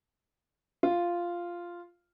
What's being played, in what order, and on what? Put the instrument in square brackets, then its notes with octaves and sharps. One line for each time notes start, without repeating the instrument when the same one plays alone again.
[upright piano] F4